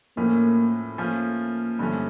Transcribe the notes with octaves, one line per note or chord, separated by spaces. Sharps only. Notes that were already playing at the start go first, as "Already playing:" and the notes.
A2 F3 A3 A#3 C#4
F3 A3 A#3 C#4 F4
G2 D3 F3 A3 C#4